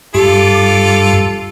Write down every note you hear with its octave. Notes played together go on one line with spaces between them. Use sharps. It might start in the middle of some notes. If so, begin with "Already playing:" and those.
G2 F4 G4 A4 D6